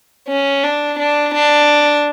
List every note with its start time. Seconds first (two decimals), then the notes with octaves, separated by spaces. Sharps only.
0.28 C#4
0.63 D4
0.99 D4
1.35 D4